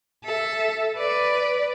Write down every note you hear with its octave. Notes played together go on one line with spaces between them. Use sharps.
A4 E5
B4 D5